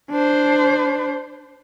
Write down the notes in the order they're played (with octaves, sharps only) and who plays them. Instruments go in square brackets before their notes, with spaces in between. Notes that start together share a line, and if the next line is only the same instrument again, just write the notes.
[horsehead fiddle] D4 C5